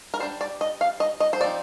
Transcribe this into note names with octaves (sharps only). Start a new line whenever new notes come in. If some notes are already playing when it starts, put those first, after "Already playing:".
A#4
G3 D4 C5
D5
D#5
F5
D#5
D#5
C5
F3 C4 D#4 D5